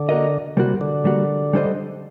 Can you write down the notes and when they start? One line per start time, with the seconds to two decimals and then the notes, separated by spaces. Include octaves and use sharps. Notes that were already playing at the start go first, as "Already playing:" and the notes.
Already playing: D3
0.09 A#3 F#4 A#4 D#5
0.57 C3 G3 A#3 F#4
0.81 D3
1.05 G3 A#3 F#4
1.53 G3 D4 A4 C5 D#5